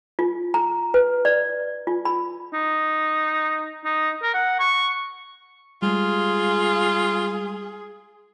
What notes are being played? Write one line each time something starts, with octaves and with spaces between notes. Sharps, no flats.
F4
A#5
B4
D5
F4
B5
D#4
D#4
A#4
F#5
C#6
G3 G#3 F4 G#4